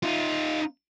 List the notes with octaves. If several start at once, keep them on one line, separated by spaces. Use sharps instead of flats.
D#4 F4